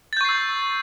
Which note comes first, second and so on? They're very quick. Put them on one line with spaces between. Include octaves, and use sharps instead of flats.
A6 G6 C#6 C7 E6